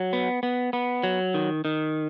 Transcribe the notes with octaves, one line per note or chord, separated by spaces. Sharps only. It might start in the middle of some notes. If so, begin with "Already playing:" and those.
Already playing: F#3
B3
B3
B3
F#3
D#3
D#3